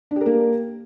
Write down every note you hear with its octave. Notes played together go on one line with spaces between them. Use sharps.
A#3 D4 G4 A#4